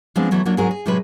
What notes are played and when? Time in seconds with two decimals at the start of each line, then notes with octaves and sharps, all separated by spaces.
0.16 F3 G#3 B3 C4 D4
0.31 E3 F#3 A3 B3
0.45 F#3 A#3 D4 F4 F#4
0.57 G#2 F#3 C4 F#4 G#4 A#4
0.71 G#4
0.86 A2 C3 F#3 G#3 B4